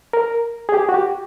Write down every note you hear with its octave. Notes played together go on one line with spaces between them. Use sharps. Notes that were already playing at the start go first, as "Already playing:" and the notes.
A#4
G#4
G4
F#4
G4